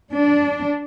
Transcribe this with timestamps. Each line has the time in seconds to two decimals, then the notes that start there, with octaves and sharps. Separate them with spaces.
0.13 D4